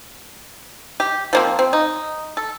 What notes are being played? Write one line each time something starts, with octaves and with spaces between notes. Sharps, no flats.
G4
F3 A#3 C4
C4
D#4
A4